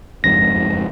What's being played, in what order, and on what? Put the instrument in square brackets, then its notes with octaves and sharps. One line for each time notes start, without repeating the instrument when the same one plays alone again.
[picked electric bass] F#1 F2 G#2 [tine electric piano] A#6